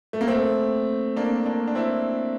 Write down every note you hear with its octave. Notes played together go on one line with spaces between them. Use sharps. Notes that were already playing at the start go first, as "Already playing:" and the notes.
A3
A#3
A3 C4
A#3 D4
A#3 D4
D4
C4 E4